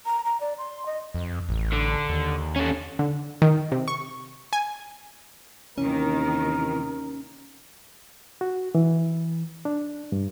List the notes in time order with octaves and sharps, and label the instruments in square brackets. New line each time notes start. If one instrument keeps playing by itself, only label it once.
[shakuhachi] A#5
A#5
D5
C6
D#5
[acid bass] F2
A1
[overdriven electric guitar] D3
[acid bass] D#2
[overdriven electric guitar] C#4 A4
[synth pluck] D3
D#3
C3
C#6
G#5
[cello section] D#2 D#3 [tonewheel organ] C3 E3 [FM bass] C#4 [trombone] A#4
[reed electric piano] F#4
E3
D4
G2